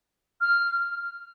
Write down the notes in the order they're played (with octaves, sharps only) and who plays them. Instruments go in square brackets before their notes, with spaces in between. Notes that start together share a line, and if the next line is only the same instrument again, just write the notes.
[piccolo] F6